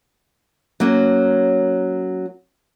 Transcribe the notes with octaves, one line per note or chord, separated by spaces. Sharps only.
F#3 A#3 C#4